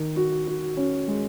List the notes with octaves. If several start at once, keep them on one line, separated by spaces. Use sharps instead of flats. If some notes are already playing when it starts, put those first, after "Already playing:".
Already playing: D#3
F#4
F#4
C#4
G#3